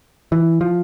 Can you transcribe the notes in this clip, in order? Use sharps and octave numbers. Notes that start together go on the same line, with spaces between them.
E3
F3